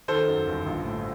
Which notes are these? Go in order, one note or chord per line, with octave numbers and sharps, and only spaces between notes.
D#3 A4 C5
F#2
G1
A#1
A2